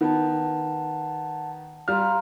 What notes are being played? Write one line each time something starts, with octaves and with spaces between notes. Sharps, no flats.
D#3 B3 F#5 A5
G3 F5 A#5 C6 F6